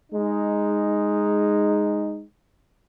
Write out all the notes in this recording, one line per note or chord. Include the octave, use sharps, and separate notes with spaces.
G#3 D#4